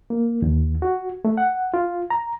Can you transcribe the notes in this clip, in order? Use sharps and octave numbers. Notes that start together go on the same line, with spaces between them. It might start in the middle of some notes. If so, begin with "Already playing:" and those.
A#3
D#2
F#4
A3
F#5
F4
A#5